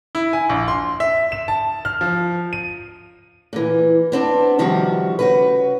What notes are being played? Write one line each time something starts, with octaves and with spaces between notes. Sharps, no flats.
E4
G#5
A#1
C6
E5
E7
A5
F6
F3
D#7
A#2 E3
B3 C4 D4
C3 D#3 F3 G3 F#4
C#3 F#4 B4